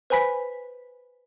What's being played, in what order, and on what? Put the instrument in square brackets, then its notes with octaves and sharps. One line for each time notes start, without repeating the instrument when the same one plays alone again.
[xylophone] B4 C5 G#5 B5 B6